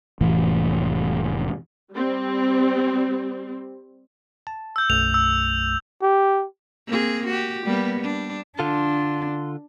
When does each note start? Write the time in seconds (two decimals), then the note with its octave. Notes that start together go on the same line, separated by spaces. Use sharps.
0.21 F1 A2 E3
1.91 G3 C4
4.47 A5
4.76 E6 G6
4.90 B1 F#2 A3 F7
5.14 E6
6.02 G4
6.88 A#3 C4 G#4
7.27 F#4 G4
7.65 G3 A#3 B3
8.00 G3 D4
8.59 D3 D4 F4 A4 C6